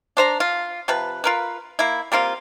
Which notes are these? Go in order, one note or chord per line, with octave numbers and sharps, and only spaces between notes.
D4 C5 A#5
F4
C3 F3 B4
F4 A#4 B4
A#3 E4
G3 A#3 C4 F4